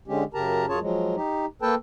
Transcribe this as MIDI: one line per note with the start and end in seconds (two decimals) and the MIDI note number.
0.08 0.24 50
0.08 0.24 56
0.08 0.24 61
0.08 0.24 67
0.34 0.66 42
0.34 0.66 49
0.34 0.66 67
0.34 0.66 70
0.34 0.66 81
0.34 0.66 82
0.69 0.79 42
0.69 0.79 61
0.69 0.79 65
0.69 0.79 68
0.69 0.79 73
0.69 0.79 81
0.81 1.16 53
0.81 1.16 54
0.81 1.16 56
1.16 1.46 63
1.16 1.46 67
1.62 1.75 58
1.62 1.75 69
1.62 1.75 71
1.62 1.75 79
1.62 1.75 81